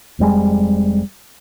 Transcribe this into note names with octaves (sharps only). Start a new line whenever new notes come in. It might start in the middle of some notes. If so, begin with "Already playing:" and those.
F1 F2 G3 G#3